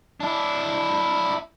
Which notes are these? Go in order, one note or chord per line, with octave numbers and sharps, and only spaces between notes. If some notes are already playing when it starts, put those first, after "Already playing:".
D4 E4